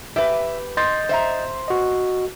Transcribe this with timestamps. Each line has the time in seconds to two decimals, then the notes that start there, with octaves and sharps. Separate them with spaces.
0.16 G4 B4 E5
0.77 D#5 C6 G6 A6
1.09 C5 E5 A#5
1.68 F#4 D#5